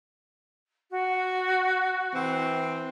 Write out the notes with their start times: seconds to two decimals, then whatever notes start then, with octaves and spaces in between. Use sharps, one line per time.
0.91 F#4
2.13 E3 C4